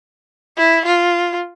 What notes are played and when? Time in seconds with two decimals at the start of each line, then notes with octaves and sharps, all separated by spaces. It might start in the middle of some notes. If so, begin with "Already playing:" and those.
0.57 E4
0.85 F4